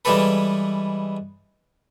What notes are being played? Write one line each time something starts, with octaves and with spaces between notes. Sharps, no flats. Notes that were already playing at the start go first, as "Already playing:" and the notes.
E3 G3 G#3 G4 A4 B4